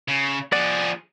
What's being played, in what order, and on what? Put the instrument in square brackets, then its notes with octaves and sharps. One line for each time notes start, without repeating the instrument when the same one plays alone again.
[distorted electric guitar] C#3
[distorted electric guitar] F3 G#4 [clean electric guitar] D5 F#5